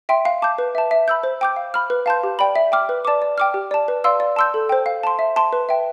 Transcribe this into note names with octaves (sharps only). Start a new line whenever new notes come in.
E5 G5 C6
F5
A5 D6 G6
B4
E5 A5
E5
B5 E6 G6
C5
G5 D6 G6
F5
B5 F6
B4
F5 A5 C6 G6
G4
D5 G5 B5
E5
G5 D6 F6
B4
D5 A5 D6
D5
G5 D6 F6
G4
D5 A5
B4
D5 F5 C6 E6
D5
A5 C6 E6 G6
A4
C5 G5
F5
A5 C6
E5
A5 C6
B4
E5 G5